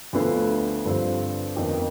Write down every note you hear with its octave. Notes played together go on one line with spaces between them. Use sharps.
D2 D3 F3 B3
G2 D3 F3 C4 G4
F2 D#3 B3